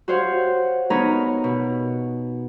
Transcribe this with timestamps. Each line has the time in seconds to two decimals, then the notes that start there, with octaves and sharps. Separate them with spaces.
0.08 F#4 G4 C5 C#5 F5 F#5
0.90 B3 D#4 A#4 C#5 A#5 B5
1.44 B2